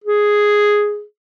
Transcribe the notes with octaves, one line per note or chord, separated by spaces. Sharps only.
G#4